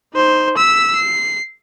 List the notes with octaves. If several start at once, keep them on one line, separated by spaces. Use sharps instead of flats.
D#4 C5
E6 B6
C7